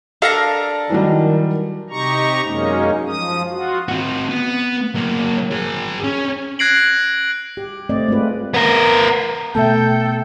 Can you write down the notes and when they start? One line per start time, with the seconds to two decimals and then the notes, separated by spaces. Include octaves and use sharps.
0.22 D4 A4 A#4 F5 A#5
0.90 D#3 E3 F#3 G3
1.90 C3 D#4 G4 A#5 C#6
2.45 F#2 G#3 A#3 C#4 D#4
3.07 F3 D#6
3.50 F4 F#4
3.88 C4 F#4
4.29 B3
4.95 F#3 A#3
5.51 G#4 A#4
6.04 C#4
6.59 F#6 G#6 A#6 C7 D7 F#7
7.57 G4
7.89 A3 C4 D5 D#5
8.08 G#3 A3 C4 F4 B4
8.54 B3 A#4
9.55 B2 A3 B3 A4 E5 G5 A5 G6